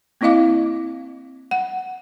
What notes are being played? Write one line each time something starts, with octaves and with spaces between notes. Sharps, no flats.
A#3 C4 E4 D#5 F5 D6
F#5